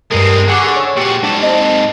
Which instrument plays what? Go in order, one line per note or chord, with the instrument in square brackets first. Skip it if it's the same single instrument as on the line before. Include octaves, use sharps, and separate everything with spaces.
[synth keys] G2 D#6 [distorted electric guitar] G#3 C4 [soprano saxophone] A#4
[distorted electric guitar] D3 [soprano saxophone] G#4 [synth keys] F#5 C#6 D6
[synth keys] C#5 E6
[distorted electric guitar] A#2 F#4 [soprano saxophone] G4 [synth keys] C#6
[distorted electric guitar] G#2 A4 [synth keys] D4
[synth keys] C4 [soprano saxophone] D#5